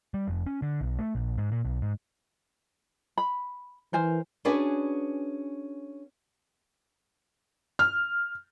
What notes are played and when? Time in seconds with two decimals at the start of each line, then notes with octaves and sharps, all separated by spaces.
0.14 G3
0.28 F1
0.46 C#4
0.62 D3
0.81 B1
0.99 A3
1.15 A#1
1.37 G#2
1.52 A#2
1.65 B1
1.82 G#2
3.18 B5
3.93 E3 A#4 C5 G#5
4.45 C#4 D4 F#4 G#4 B4 D5
7.79 F6